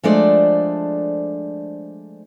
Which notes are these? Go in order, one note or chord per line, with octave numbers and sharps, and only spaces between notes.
F3 G#3 A3 D4 C5 D5